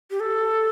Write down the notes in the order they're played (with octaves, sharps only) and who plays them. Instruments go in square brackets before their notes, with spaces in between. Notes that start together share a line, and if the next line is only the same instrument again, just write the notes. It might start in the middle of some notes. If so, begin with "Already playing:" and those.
[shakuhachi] G4
A4